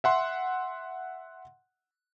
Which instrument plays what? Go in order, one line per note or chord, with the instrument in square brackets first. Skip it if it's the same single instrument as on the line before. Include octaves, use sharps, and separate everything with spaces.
[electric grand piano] E5 F#5 C6